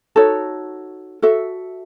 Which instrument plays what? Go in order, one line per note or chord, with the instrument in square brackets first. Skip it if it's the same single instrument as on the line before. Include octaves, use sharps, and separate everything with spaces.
[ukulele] D#4 F#4 A4 C#5
F#4 A4 E5